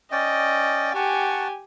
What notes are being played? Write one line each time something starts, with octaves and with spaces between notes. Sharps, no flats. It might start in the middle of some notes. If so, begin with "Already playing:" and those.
C#4 D5 D#5 G5
G4 F#5 G#5 A5 C#6